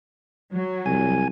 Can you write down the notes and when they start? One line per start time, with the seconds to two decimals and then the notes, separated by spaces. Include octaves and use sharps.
0.52 F#3
0.86 C2 G#5